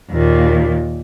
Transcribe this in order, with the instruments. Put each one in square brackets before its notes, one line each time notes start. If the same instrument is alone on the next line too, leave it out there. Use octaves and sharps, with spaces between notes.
[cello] D#2 A#2